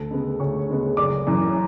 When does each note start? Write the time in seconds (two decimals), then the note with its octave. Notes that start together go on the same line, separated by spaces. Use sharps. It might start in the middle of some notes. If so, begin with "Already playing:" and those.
Already playing: D2 A4
0.11 C#3 G#3 B3
0.40 D2 C#5 C#6
0.69 C#3 G#3 B3
0.97 F#1 D5 D6
1.27 F#2 E3